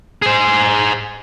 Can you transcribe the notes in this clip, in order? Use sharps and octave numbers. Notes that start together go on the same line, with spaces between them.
G#4 C5